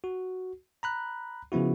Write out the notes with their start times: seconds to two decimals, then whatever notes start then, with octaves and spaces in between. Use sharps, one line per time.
0.04 F#4
0.83 A#5 B5 F#6
1.52 C#3 F3 B3 E4 F#4